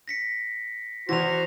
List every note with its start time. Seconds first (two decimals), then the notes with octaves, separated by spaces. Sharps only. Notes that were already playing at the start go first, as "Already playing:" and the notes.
0.08 A#6 B6 C#7
1.09 E2 E3 F#4 C5 A#6 F7